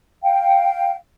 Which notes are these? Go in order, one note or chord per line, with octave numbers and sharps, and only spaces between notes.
F5 G5